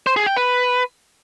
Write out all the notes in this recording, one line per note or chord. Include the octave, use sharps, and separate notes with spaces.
C5
G#4
G5
B4